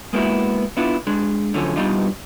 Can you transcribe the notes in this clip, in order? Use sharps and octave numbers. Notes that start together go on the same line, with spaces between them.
G#3 A#3 B3 E4 F#4
B3 D4 E4 F4
G#3 D4
D3 F3 F#3 A3 C#4
G2 B2 G3 D4 D#4 F4